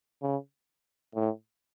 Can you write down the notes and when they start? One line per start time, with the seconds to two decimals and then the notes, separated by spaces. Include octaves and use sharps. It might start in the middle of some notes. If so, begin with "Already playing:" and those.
0.22 C#3
1.15 A2